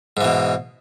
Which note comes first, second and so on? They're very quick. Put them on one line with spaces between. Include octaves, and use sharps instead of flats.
G#2 E3 B2